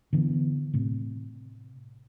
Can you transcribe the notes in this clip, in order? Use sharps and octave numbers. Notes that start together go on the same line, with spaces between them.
D3 E3 B3
A2 C3